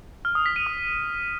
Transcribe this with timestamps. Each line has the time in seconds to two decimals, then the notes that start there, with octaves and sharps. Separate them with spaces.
0.25 F6
0.35 D#6
0.46 B6
0.56 D#7
0.67 D#6